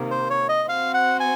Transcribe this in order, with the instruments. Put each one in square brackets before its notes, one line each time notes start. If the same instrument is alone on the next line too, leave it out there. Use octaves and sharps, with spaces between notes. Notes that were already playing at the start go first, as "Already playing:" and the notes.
Already playing: [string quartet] C3 D#3 A#3
[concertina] C5
C#5
D#5
[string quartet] C4 F#4 C5 [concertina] F5
[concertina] F#5
G#5